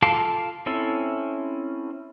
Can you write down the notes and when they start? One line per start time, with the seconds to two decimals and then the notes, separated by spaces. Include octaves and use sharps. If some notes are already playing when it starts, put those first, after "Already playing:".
0.02 F4 A4 F5 A5 D6
0.66 C4 C#4 E4 A4